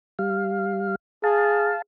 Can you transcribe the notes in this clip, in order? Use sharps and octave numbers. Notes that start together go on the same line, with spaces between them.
G3 F5
G#4 F5 A5